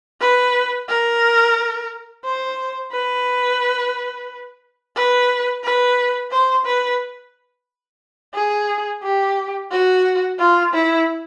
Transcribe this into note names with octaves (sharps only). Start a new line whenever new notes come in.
B4
A#4
C5
B4
B4
B4
C5
B4
G#4
G4
F#4
F4
E4